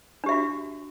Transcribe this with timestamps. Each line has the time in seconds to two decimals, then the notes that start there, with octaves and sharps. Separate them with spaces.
0.24 D4
0.26 G4
0.29 E5
0.31 F#4